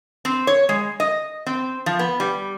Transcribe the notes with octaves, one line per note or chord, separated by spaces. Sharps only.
C4
C#5
G#3
D#5
C4
F3
B3
G3